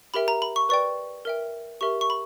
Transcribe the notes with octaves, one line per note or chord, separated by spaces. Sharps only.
G4 A#4 E5 G5 B5
A#5
B5
C#6
B4 D5 G5 C#6
A#4 E5 G5
G4 A#4 E5 C#6
C#6
B5